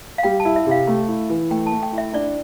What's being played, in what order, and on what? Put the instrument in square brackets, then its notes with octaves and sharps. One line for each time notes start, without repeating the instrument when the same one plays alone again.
[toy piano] F5
[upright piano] G3 [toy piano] G5
[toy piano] A5
[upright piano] E4
[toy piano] E5
[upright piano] C3
[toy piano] F5
[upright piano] A3
E4
E3
[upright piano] A3 [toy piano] G5
[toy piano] A5
[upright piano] A3
[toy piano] G5
[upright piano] E4
[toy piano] E5
[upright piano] D4 [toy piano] D5